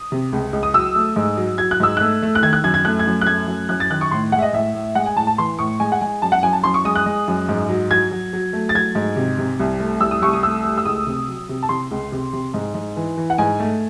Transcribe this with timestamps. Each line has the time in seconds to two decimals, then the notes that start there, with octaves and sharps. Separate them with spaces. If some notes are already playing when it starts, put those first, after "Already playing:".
Already playing: D#6
0.12 C3
0.32 C#2
0.53 C#2
0.63 D#6
0.74 F#3 E6
0.95 A3
1.16 G#2
1.37 F#3
1.58 F#3 G#6
1.71 F#6
1.80 G#2 E6
1.97 A3 F#6
2.22 A3
2.35 F#6
2.42 D#3 G#6
2.53 F#6
2.64 F#2 G#6
2.74 G#6
2.85 A3 F#6
2.99 G#6
3.07 F#2
3.21 F#6
3.27 A3 G#6
3.48 F#2
3.69 F#2 F#6
3.80 A6
3.90 D#3 F#6
4.01 C#6
4.11 A2 C6
4.32 G#3 F#5
4.39 E5
4.42 D#5
4.53 A2 E5
4.75 A2
4.95 G#3 F#5
5.06 G#5
5.16 A2 A5
5.27 A5
5.38 E3 C6
5.59 A2 C#6
5.80 G#3 G#5
5.92 F#5
6.01 G#3 G#5
6.22 F#2 A5
6.32 F#5
6.43 F#2 G#5
6.53 A5
6.64 F#2 C6
6.74 C#6
6.85 G#3 D#6
6.95 F#6
7.06 G#3
7.28 F#2
7.49 G#2
7.69 F#3
7.90 F#3 G#6
8.11 F#3
8.33 F#3
8.53 A3
8.69 A6
8.75 F#3 G#6
8.95 G#2
9.16 C3
9.38 C3
9.60 C2
9.80 A3
10.00 C2 E6
10.11 D#6
10.22 C2 C#6
10.33 D#6
10.43 A3 E6
10.64 A3
10.78 E6
10.85 C#2 D#6
11.07 C3
11.27 F#3
11.49 C3
11.63 A5
11.69 C3 C6
11.91 C#2
12.12 C3
12.33 C3
12.54 G#2
12.75 G#2
12.97 E3
13.17 E3
13.30 F#5
13.38 G#2 G#5
13.60 A3